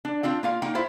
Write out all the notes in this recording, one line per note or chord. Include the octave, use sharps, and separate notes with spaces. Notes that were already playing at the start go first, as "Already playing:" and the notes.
D4
C4 D4 F4 G5
A#3 F4 F5
A#3 D#4 G5
E4 F4 C5 E5